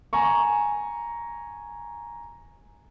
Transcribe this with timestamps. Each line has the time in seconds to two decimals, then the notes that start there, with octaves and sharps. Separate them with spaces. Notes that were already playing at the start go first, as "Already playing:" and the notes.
0.13 G#5 A#5 C#6